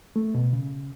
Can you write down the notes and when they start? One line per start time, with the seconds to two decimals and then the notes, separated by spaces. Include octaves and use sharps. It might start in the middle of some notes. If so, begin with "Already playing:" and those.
0.16 A3
0.35 B2
0.53 C#3